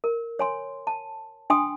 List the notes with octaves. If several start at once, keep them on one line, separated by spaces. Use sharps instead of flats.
A#4
C#5 G#5 C6
A5
D4 G5 G#5 C6 D#6